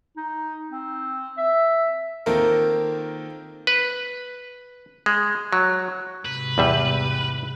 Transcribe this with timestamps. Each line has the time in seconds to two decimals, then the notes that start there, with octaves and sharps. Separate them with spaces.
0.16 D#4
0.71 C4
1.37 E5
2.26 D#3 A#3 C4 F4 A4 A#4
3.67 B4
5.06 G#3
5.53 F#3
6.25 G#2 C3 B4
6.58 E2 G3 E5